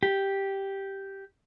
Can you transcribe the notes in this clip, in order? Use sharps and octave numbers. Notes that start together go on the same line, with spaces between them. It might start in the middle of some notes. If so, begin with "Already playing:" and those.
G4